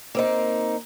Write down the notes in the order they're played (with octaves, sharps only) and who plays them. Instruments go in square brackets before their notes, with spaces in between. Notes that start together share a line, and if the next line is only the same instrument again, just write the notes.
[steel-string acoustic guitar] A#3 C4 D#4